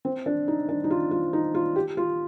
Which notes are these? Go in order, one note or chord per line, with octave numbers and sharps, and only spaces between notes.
C4
D4
D#4
D4
D#4
F4
F4
D#4
F4
G4
F4